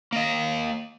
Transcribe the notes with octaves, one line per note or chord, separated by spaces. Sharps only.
A#3 D#5